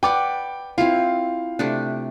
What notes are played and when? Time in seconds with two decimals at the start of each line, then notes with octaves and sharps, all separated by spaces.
0.03 B4 D5 F#5 G5 D6
0.78 C4 E4 F4 F5
1.59 C3 A3 D4